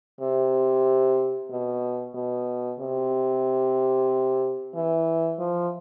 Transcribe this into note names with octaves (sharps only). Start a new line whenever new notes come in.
C3
B2
B2
C3
E3
F3